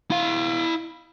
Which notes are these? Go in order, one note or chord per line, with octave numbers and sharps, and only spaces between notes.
E4 F5